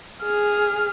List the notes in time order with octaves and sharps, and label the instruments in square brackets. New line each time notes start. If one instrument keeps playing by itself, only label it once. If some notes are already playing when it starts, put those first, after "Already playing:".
[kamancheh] G#4 F6